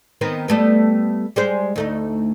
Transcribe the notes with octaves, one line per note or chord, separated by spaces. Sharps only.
D#3 B3 C4
G3 A3 B3
G3 G#3 C5
D2 A3 D#4